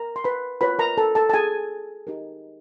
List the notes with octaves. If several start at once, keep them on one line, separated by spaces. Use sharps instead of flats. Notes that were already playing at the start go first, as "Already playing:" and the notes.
Already playing: A#4 A#5
C6
B4 B5
F4 A#4 B4 C#5 B5
A#4 A#5
A4 A5
A4 A5
A5
G#4 G#5
D#4 G4 A#4